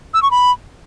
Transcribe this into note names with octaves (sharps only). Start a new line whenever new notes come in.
E6
C#6
B5